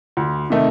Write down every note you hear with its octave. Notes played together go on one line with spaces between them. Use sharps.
D2
C3 D#3 A3 D#4